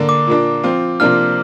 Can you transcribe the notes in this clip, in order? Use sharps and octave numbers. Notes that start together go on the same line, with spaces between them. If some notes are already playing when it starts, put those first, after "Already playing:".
Already playing: D3 A#3 D4
D6
A#2 A#3 D4
F3 C4 F4
C3 F3 A#3 D4 F4 F6